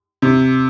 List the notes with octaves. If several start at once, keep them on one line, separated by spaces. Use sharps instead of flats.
C3